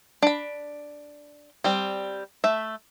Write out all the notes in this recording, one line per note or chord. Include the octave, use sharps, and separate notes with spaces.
D4 B5
G3 C4
A3 E5